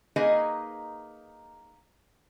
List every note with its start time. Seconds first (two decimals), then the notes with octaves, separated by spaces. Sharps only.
0.16 A#3 D#4 G#4 B4 D#5 G#5